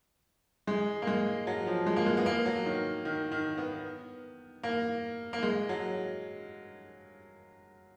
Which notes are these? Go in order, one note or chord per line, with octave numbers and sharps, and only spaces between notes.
G#3
A#3
G#3
F#3
F3
G#3
A#3
G#3
B3
A#3
F#3
D#3
D#3
D#3
B3
A#3
A#3
G#3
F#3